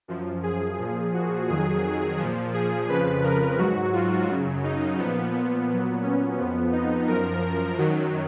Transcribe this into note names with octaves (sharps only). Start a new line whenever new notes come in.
F#2 F3
G#4
A#2 F3 G#4
F#4
F2 D#3 F#3 G#4
A#2 F3
G#4
F2 C#3 F3 B4
A#4
G#2 F#3 F#4
F4
F#2 C#3 F#3
D#4
A#2 F3 B3
B3
A#2 F#3 B3
C#4
F2 F3 B3
D#4
F#2 F3 A#4
F#2 D#3 F#3